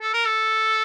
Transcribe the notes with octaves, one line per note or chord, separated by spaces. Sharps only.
A4
A#4
A4